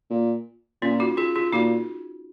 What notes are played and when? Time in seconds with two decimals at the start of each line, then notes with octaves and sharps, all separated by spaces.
0.10 A#2
0.81 A#2 C#4 F4
1.00 D#4 F#4
1.17 F4 G#4
1.36 F4 G#4
1.53 A#2 D#4 F#4